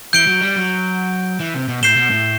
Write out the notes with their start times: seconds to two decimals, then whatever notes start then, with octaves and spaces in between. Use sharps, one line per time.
0.13 E3 G6 D7 G7
0.27 F#3
0.41 G3
0.56 F#3
1.40 E3
1.54 C3
1.68 B2
1.82 A2 G6 C7 E7 G7
1.96 B2
2.10 A2